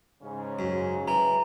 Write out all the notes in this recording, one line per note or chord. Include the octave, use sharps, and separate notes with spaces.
G#2 C#3
F#2
E3 A#5